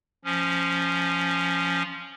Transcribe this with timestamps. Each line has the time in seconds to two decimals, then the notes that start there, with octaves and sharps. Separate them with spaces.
0.25 F3 C#4